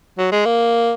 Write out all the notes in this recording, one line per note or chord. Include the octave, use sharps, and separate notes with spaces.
F#3
G#3
A#3